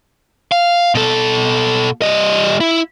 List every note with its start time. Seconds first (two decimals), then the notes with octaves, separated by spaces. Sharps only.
0.52 F5
0.95 B2 A4
2.02 G3 D#5
2.60 E4